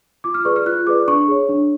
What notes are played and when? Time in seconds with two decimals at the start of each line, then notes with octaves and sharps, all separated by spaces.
0.24 F4 D6
0.34 F6
0.45 G#4 B4 D5 C#6
0.56 F6
0.66 F4 F#6
0.87 G#4 B4 D5 D6
1.08 D4 C#6
1.28 G#4 C#5
1.49 D4